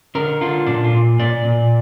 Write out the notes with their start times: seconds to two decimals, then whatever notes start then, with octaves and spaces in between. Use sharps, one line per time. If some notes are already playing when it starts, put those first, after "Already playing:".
0.15 D3 A#4
0.41 D3 F4
0.66 A#2 D4
0.84 F4
0.93 A#2
1.19 A#2 D5
1.44 A#2